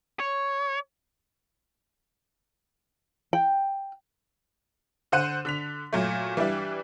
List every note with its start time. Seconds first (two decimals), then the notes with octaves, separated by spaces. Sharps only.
0.20 C#5
3.33 G5
5.12 D3 C5 F#5 D#7
5.45 D3 B6 F7
5.93 A#2 F#3 A3
6.37 E3 G3 D4 E4